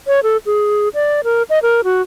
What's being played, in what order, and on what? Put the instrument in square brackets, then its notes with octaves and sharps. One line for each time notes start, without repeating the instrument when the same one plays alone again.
[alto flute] C#5
A4
G#4
D5
A#4
D#5
A#4
F#4